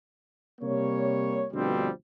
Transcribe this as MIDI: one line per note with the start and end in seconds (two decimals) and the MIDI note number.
0.61 1.47 48
0.61 1.47 55
0.61 1.47 58
0.61 1.47 73
1.53 1.88 38
1.53 1.88 43
1.53 1.88 47
1.53 1.88 53
1.53 1.88 55
1.53 1.88 60